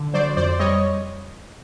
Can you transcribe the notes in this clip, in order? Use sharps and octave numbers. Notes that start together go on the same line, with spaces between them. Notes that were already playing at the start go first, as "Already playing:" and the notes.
Already playing: D3
F#3 C5 D5
F2 C5 D5
G3 C#5 D#5